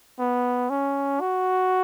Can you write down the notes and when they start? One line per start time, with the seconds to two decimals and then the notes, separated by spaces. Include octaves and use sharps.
0.19 B3
0.70 C#4
1.20 F#4